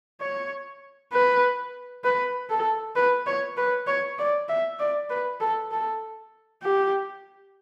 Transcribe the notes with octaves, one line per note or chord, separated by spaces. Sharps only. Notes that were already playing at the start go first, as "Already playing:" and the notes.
C#5
B4
B4
A4
B4
C#5
B4
C#5
D5
E5
D5
B4
A4
A4
G4